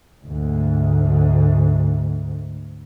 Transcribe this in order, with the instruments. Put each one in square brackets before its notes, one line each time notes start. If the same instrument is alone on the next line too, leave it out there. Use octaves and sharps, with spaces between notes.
[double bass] D2 G#2